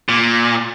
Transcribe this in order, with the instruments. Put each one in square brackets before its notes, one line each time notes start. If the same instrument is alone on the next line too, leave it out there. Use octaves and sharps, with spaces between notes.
[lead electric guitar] A#2